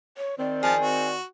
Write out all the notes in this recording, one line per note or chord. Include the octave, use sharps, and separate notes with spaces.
C#5
D#3 C4 D5
F3 G#4 A5 F6
F#4